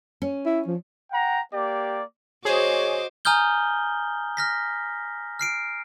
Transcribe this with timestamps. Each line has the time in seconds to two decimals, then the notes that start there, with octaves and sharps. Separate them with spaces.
0.22 C#4
0.46 E4
0.67 F3
1.12 F#5 G5 A#5
1.53 A#3 G4 D5
2.45 F#4 G#4 C5 C#5 D#5 D6
3.25 G#5 A#5 D#6 F6 G6 G7
4.37 F6 A#6 B6
5.39 F6 C7 D7